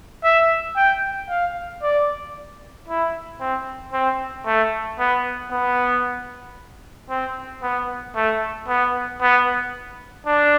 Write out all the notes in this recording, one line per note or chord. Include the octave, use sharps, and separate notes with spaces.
E5
G5
F5
D5
E4
C4
C4
A3
B3
B3
C4
B3
A3
B3
B3
D4